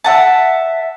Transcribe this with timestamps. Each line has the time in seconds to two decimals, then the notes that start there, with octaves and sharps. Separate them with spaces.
0.04 E5 F#5 A5